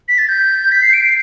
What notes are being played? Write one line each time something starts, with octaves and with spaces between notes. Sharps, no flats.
B6
A6
G6
B6
C7
D7
C7